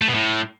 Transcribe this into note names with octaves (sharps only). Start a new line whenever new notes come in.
A3
B2
A2